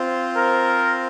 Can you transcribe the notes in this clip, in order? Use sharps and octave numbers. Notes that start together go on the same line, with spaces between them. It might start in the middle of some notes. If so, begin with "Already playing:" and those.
Already playing: C4 F4 C5
A#4